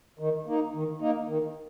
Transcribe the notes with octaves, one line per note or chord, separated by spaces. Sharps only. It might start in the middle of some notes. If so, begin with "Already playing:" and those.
D#3
A#3 D#4
D#3
A#3 D#4
D#3